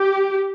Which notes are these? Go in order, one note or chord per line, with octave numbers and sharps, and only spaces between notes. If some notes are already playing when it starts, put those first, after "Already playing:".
Already playing: G4